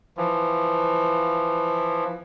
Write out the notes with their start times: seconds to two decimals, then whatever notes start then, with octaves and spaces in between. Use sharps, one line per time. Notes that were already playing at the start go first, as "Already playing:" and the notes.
0.17 E3 F3